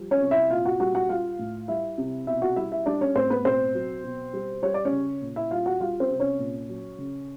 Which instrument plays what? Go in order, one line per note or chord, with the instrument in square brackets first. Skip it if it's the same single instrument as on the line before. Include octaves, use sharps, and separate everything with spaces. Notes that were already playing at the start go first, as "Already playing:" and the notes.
Already playing: [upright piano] F3 G3
C#4 C#5
C3
E4 E5
A#2 F4 F5
F#4 F#5
G3 F#4 F#5
F#4 F#5
G3 F4 F5
A2
G3 E4 E5
C3
B2 E4 E5
F#4 F#5
G3 E4 E5
E4 E5
G3 D4 D5
C#4 C#5
A2 C4 C5
B3 B4
B2 C4 C5
F#3
B2
G3
G3 C#5
D5
C#4 C#5
C#3
A#2
E4 E5
G3 F4 F5
F#4 F#5
G3 F4 F5
C4 C5
C3
C#4 C#5
A#2
F#3
C#3